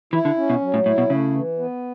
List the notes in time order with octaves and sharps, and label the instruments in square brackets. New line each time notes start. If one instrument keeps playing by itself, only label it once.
[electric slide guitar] E3 [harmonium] E4
[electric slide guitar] D3
[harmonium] C#4
[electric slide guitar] B2
[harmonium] F#3
[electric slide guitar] A2
[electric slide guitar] A2 [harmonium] E4
[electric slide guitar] B2
[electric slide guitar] C#3 [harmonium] A3
[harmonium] E3
B3